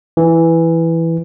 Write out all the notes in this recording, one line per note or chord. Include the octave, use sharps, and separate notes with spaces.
E3